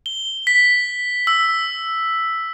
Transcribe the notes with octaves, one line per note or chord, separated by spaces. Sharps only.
G7
B6
E6